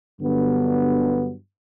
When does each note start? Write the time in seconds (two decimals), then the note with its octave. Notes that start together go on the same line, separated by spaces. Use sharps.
0.21 G2 D3 F#3 B3